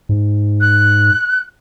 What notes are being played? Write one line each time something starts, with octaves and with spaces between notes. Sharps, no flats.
G#2
F#6